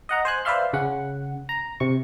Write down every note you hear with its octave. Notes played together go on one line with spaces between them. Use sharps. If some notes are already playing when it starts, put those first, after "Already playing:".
D#5 F#5 A#5
C5 G#5 F#6
B4 C5 D5 E5 F5 C6
C#3 C#4 F#5
A#5
C3 C#6